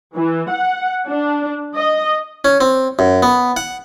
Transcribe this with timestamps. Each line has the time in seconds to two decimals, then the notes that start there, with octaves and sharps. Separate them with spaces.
0.16 E3
0.51 F#5
1.08 D4
1.75 D#5
2.45 C#4
2.61 C4
2.99 F#2
3.23 B3
3.57 F#5